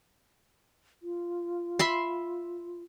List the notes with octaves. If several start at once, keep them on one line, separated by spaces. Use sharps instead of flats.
F4
E5 B5 C6